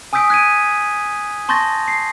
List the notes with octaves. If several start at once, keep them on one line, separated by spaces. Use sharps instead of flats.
G#5 D#6 E6 G6 B6 D7
F#6 G#6 B6 D7 D#7
A5 C6 C#6 G6 A6 A#6
C7